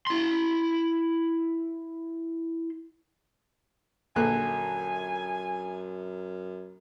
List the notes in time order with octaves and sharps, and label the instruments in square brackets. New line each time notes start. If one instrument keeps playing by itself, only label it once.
[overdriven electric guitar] E4 C6
[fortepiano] A#1 D3 F#6 [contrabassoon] F#2 [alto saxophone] G#5